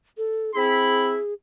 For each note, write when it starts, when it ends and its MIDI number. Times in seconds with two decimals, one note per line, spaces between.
0.18 0.51 69
0.55 1.16 60
0.55 1.16 64
0.55 1.34 68
0.55 1.11 83